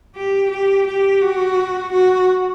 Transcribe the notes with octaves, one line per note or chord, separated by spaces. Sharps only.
G4
G4
G4
F#4
F#4